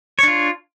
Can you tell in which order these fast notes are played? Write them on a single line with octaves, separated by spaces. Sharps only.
C#5 D4 F4